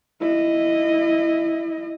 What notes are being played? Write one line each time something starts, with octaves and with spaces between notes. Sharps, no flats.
E4 D#5